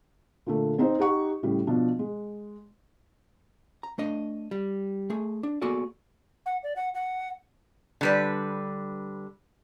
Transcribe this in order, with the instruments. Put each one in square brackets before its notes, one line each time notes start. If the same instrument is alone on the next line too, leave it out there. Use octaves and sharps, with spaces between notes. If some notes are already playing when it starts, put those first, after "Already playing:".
[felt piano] A#2 D3 A3
C4 D#4 C5
D#4 G4 F#5 C#6
A2 C#3 G3
B2 F3 D4
G#3
[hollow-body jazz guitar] A#5
A3 D4 D#5
G3
A3 G#4
D4
A#3 B3 F#4 G#4 A4 D5
[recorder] F#5
D5
F#5
F#5
[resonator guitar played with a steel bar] D3 G3 B4